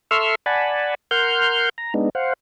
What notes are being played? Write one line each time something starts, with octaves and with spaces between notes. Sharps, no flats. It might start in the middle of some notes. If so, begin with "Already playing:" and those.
A4 E5 C6 C#6 E6 F6
D5 F#5 G#5 A5 B5
A#4 F#5 C6 F6 G6
A#5
G#3 B3 D4 D#4
C5 F5 F#5